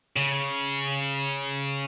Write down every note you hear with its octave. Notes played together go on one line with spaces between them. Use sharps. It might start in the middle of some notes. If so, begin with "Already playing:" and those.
C#3